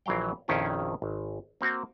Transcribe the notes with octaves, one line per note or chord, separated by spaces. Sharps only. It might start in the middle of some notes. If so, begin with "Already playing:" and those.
A#1 E3 F#3 F5 G5
A#1 F2 D#3 C#4 E4 F4
G#1
A#3 C4 F#4